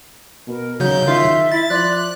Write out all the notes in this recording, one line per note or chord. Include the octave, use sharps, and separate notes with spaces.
B2 A#4
C#3 F#3 D#4 G6
D#3 F4 E5
E4 A6
F3 D5 C6 F#6